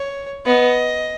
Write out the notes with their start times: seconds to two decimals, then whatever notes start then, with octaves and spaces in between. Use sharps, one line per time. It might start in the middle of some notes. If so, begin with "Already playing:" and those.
Already playing: C#5
0.46 B3 D#5